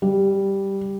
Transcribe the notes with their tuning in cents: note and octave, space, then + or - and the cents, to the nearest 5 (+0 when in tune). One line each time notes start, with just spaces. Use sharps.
G3 +0